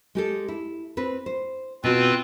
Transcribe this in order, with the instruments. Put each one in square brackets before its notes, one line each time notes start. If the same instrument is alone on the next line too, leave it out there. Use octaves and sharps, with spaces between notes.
[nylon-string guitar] G#3 G4 A4
E4
C4 B4
C5
[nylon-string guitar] B2 F#4 [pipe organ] C4 F4 B4